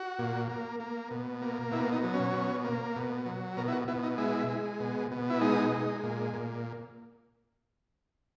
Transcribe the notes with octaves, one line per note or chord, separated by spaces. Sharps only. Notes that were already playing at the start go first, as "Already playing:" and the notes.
Already playing: F#4
A#2
A#3
A#3
B2
A#3
B2 E4
D#4
F#3
C#4
B2
A#3
B2
F#3
B2 A#4
E4
F#4
B2 E4
D#4
G#3 E4
G#3
B2
B2
E4
G#3 D#4
G#3
A#2
A#2